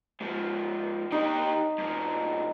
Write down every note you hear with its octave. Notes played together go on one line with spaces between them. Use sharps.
G#2 F3
D#3 D#4 G4
G2 F3